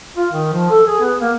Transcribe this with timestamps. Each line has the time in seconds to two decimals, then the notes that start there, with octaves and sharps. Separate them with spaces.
0.17 F4
0.32 D#3
0.52 F3
0.70 A4
0.87 G#4
1.01 B3
1.21 A#3